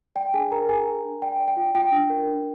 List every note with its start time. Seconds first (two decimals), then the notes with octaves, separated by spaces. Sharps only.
0.15 D5 G5
0.34 D4 G#4 G#5
0.51 D4 A#4 A#5
0.69 G#4 G#5
0.86 G#4
1.05 D4
1.22 D5 G5
1.40 D5
1.48 G5
1.57 F4
1.75 F4 G5
1.92 D4
2.10 A#4
2.27 D4